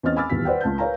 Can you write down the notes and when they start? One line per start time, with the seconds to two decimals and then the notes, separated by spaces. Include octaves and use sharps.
0.03 E2 C4 C#4 D#5 F6 A6
0.17 G#5 B5 D6 E6 F6 A6
0.30 D#1 E2 G4 B6
0.45 B4 C5 D5 F#5 G5
0.61 C#2 A5 G6
0.78 A#4 B4 C#5 F5 G#5 A#5